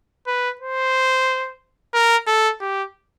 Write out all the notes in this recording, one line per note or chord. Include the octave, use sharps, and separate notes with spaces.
B4
C5
A#4
A4
G4